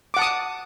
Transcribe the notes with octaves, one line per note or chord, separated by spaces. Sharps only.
F#5 A5 D6 D#6